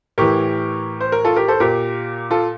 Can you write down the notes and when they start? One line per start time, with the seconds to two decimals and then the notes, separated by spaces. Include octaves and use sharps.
0.18 A2 E3 G4 A#4
1.01 C5
1.12 A#4
1.25 F4 A4
1.36 G4 A#4
1.48 A4 C5
1.60 A#2 G4 A#4
2.31 F4 A4